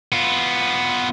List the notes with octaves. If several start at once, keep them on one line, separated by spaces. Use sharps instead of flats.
B3 F4